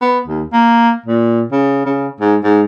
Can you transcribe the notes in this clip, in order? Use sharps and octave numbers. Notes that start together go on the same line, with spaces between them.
B3
D#2
A#3
A#2
C#3
C#3
G#2
G#2